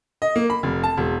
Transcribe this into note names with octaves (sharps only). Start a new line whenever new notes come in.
D#5
A#3
B5
F1
A5
E1